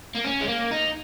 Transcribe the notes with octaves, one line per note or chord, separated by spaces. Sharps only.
A#3
C#4
G#3
A#3
D#4